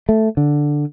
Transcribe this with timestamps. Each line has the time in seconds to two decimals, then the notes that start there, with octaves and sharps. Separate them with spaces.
0.09 A3
0.37 D3